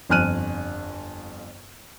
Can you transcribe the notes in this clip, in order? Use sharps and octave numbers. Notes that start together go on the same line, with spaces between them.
G1 F2 G#5 F6 F#6 D#7